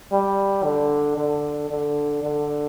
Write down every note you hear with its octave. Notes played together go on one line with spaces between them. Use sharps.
G3
D3
D3
D3
D3